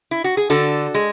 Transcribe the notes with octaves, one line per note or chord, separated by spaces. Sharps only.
E4
F#4
G#4
D3 F#4 A4
G#3